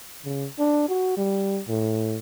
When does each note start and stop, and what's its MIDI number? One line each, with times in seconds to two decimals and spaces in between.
0.25 0.47 49
0.59 0.88 62
0.89 1.16 66
1.17 1.61 55
1.68 2.19 45